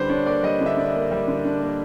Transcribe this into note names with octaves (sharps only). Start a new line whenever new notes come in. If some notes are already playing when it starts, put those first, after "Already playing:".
Already playing: D3 G3 B4 C5
D4 C#5
A#3 D5
G3 D#5
D3
E5
D4
E5
A#3
G3 E5
D3
D4
A#3